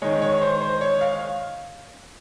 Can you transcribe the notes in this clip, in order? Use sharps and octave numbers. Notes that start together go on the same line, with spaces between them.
D#3 G#3 C#5
C#5
C5
C5
C#5
F5